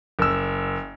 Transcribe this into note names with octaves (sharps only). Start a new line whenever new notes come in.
F#1 E6